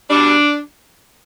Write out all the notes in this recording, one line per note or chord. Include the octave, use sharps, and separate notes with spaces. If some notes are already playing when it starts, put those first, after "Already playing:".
B2 G3 D4